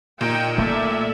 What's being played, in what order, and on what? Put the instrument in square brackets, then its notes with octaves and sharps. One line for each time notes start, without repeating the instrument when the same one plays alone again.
[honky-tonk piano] A#2 [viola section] D#4 G5
[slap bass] A3 A#3 [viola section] A4 D5 E5